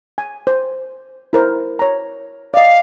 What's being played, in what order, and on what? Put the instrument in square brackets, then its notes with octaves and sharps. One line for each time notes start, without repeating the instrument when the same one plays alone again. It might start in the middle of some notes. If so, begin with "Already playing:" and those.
[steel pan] G#5
C5
E4 A#4 C5
C#5 A#5
[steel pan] D5 D#5 [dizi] F5